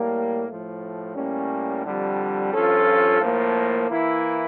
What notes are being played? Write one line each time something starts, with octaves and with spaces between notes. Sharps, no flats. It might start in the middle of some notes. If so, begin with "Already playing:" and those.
Already playing: A2 G3 A#3
A2 F3 A3
A2 G3 A#3 C#4
F2 D3 G3
G2 F3 C#4 F4 A4
A2 F3 A#3
E3 A#3 E4